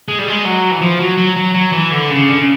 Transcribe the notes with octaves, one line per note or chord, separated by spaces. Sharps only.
G#3
G3
G#3
F#3
E3
F3
F#3
F#3
F#3
F#3
E3
D3
C#3
D3
C#3